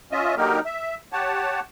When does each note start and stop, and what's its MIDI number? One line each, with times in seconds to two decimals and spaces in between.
0.12 0.35 61
0.12 0.35 65
0.12 0.35 75
0.12 0.35 76
0.37 0.59 50
0.37 0.59 54
0.37 0.59 58
0.37 0.59 63
0.37 0.59 67
0.37 0.59 70
0.65 0.95 76
1.13 1.60 67
1.13 1.60 73
1.13 1.60 78
1.13 1.60 81